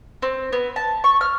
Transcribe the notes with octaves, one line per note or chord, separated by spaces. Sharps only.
C4
B3
A5
C#6
F6